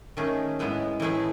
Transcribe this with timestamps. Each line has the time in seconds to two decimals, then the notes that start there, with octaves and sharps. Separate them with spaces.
0.17 D#3 A3 C#4 G#4
0.59 A2 G#3 B3 E4
1.00 A2 E3 A3 E4 G#4